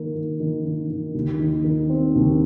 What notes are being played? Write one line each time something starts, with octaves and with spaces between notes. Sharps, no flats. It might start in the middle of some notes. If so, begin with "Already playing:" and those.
Already playing: D#3 A#3
D#3
D#3
D#3
D#3
D#2
D#3
D#3
C4
D#2